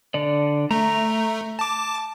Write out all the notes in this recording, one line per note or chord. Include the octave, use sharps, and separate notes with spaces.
D3 D5
A3 A#5
A5 D6